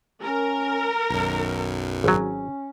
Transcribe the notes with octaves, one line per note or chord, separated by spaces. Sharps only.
C#4 A#4
B1 F#2 D#3
G#1 F#3 C#4